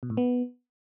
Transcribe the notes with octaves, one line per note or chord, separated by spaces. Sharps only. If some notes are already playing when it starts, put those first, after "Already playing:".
B2
A2
B3